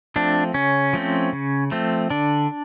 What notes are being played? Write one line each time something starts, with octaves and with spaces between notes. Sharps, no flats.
F3 A3 C4 D4
C#3 C#4
F3 A3 C4
C#3
F3 A3 C4
D3 D4